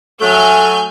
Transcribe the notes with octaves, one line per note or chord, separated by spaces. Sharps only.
F#3 A3 G#5 F6 G6